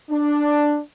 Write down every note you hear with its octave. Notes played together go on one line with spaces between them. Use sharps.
D4